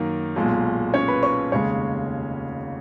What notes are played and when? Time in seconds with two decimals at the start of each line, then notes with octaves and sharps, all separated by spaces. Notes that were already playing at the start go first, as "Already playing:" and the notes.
Already playing: F#2 D#3 A#3 A#4
0.36 B1 A#2 G#3
0.94 C#4 C#5
1.08 B4 B5
1.23 C#5 C#6
1.52 F1 D#2 C#3 G#3 C#5 C#6